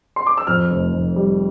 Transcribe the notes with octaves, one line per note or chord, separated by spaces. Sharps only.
C6
D6
E6
F2 F6
F1
F1
G3